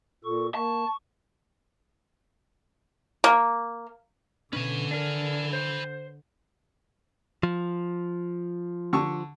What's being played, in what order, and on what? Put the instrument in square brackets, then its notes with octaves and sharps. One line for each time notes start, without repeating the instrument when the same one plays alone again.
[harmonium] A#2 [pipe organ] A4 C#6
[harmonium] A#3 [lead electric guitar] A5 [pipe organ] C#6
[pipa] A#3
[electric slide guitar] B2 C#4 [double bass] D3 [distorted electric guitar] B4 G#5
[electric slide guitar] D4 A#4
C5
[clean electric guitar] F3
[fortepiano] D3 C#6